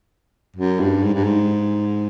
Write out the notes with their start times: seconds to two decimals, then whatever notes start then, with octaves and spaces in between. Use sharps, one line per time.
0.56 F#2
0.80 G2
1.03 G#2
1.14 G2
1.24 G#2